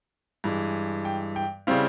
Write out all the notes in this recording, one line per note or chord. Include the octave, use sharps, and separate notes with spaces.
G2 E3 G#3
G5
G5
C#3 G3 C4 E4 F5